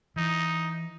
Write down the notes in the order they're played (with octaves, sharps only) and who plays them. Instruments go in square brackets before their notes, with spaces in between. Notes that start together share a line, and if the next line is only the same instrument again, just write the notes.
[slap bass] E3 [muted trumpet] D#4